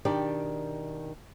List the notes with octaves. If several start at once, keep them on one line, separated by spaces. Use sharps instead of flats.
B2 D#3 D4 G4 D5